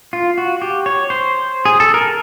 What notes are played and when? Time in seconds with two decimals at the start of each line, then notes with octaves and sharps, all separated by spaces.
0.13 F4
0.38 F#4
0.62 G4
0.86 C#5
1.10 C5
1.65 G#4
1.80 A4
1.94 A#4